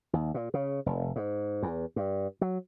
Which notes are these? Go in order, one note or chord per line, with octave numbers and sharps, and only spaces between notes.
D#2
A#2
C#3
F1
G#2
E2
G2
F#3